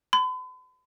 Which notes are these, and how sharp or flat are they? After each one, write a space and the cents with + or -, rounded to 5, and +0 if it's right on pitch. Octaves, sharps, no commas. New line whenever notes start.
B5 +45